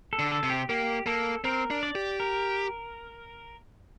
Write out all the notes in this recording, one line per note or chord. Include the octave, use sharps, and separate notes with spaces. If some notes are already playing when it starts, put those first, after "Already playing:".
A4
D3
A4
C3
G4
A#3 G4
A#3 A4
C4 A#4
D4
D5
G4
A#4